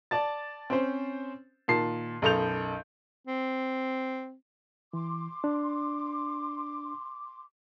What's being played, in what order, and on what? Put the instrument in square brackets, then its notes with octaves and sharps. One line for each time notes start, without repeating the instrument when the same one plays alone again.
[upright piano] D5 A5 A6
C4 C#4 C5
A#2 D#3 A5 C7
B1 F#2 A4 D#5 G6 F7
[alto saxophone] C4
[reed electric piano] E3 [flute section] C6 D6
[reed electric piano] D4